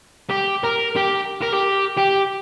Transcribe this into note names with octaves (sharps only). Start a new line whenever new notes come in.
G4
A#4
G4
A#4
G4
G4